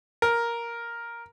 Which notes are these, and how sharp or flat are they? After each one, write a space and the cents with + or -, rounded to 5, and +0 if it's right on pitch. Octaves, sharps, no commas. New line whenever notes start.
A#4 +5